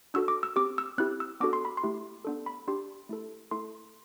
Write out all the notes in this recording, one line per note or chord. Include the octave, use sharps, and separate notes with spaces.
D4 F#4 A4 E6
D6
E6
C4 G4 D6
E6
C4 E4 G4 F#6
E6
B3 D4 F#4 A4 D6
C6
B5
C6
A3 E4 G4
B3 D4 A4
B5
D4 G4 C6
A3 E4 A4
A3 E4 A4 C6